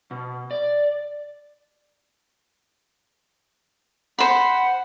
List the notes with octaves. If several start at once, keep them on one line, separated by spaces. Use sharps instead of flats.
B2
D5
C5 F#5 B5